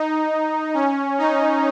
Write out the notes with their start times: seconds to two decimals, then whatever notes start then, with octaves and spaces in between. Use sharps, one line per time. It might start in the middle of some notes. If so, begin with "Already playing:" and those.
Already playing: D#4
0.74 C#4
1.18 D#4